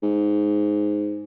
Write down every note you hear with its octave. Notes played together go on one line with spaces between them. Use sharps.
G#2